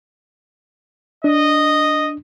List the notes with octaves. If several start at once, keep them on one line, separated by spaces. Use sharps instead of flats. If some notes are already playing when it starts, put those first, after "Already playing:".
D4 D#5